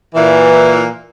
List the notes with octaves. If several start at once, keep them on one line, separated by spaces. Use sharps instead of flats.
A#2 E3